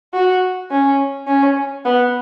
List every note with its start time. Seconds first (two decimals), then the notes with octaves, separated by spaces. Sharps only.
0.13 F#4
0.71 C#4
1.27 C#4
1.85 B3